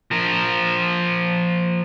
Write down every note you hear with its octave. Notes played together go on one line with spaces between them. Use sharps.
F3 A#4